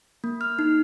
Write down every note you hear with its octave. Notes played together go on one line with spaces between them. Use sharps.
A#3
F6
D#4